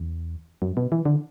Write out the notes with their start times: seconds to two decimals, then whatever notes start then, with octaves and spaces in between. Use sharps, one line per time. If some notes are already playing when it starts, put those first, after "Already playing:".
Already playing: E2
0.62 F#2
0.77 B2
0.92 E3
1.05 D3